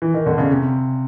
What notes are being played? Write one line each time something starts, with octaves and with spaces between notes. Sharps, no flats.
E3
D#3
D3
C#3
C3